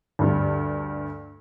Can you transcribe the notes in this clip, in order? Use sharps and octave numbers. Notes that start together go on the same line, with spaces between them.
D2 G2